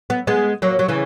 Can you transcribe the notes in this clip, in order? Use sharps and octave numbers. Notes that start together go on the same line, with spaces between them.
B3
G#3 B3
F#3 A#3
F#3
C#3 E3